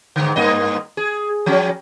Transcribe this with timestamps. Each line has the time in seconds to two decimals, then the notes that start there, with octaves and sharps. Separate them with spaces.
0.16 G#2 D3
0.36 G2 A#3 D#5
0.97 G#4
1.46 F3 F#3 C#4